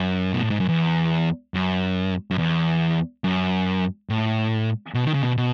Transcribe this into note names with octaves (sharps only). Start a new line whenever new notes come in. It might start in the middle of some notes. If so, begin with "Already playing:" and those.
Already playing: F#2
B2
A2
G#2
F#2
E2
F#2
F#2
E2
F#2
A2
B2
D#3
C#3
B2
B2